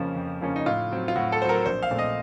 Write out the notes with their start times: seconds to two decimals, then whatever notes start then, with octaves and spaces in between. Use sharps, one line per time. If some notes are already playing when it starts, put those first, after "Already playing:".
Already playing: F2 C#3 F3 A#3 C#4
0.16 F2
0.41 C#3 F3 A#3 C#4
0.56 D#4
0.66 A2 F4
0.91 F#3 C4
1.08 F4
1.16 A2 F#4
1.32 A4
1.41 F#3 C4 C5
1.49 A#4
1.66 A#1 C5
1.83 F5
1.91 A#2 A3 C4
1.98 D#5